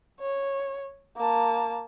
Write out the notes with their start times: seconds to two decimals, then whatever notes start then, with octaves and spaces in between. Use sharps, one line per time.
0.21 C#5
1.17 A#3 A5